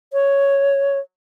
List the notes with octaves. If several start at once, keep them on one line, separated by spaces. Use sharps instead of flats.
C#5